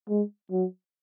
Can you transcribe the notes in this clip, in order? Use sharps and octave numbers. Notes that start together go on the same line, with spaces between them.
G#3
F#3